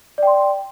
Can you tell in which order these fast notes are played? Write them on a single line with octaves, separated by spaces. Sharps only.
D5 G5 C6